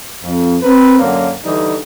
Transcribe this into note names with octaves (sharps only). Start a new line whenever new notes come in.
F2
C4 A#4 B4
F#2 D3 F#3 A#3
D3 E3 G3 D#4